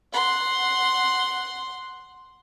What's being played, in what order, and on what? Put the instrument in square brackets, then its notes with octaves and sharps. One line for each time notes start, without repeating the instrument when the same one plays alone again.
[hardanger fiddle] F#5 C6